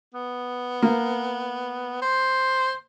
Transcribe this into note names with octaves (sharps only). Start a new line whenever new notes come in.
B3
A#3
C5